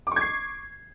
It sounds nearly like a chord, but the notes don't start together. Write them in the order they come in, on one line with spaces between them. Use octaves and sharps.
D6 C#6 G#6 C7